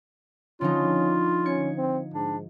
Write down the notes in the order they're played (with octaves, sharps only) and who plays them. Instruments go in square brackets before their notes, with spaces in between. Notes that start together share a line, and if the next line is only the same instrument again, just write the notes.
[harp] D3 F3 D#4 [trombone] C#4 [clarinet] F4
[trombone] C#4 [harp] G#6 C#7
[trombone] C4
[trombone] G#2 [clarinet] D4